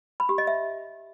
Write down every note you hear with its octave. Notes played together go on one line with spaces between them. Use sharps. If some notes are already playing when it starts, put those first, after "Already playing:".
B5
G4
D#5
E5